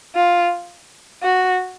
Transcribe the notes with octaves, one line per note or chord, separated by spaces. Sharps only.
F4
F#4